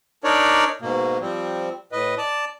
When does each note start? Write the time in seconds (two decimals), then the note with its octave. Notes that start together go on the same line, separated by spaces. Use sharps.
0.24 D4 D#4 A#4 C#5 D5
0.81 G#2 B2 A#3
1.21 F3 G3 C4
1.92 A2 B4 D#5
2.18 D5 A5